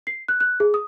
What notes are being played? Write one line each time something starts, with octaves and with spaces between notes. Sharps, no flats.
C7
F#6
F#6
G#4
D#6